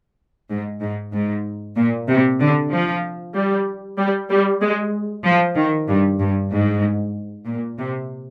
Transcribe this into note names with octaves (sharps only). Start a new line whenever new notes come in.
G#2
G#2
G#2
A#2
C3
D3
F3
G3
G3
G3
G#3
F3
D#3
G2
G2
G#2
A#2
C3